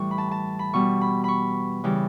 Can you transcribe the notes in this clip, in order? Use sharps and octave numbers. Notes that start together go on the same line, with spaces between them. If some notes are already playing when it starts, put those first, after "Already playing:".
Already playing: A2 E3 G3 C#6
B5
A5
A5
B5
B2 G3 C#6
B5
B5 C#6
C#3 E3 G3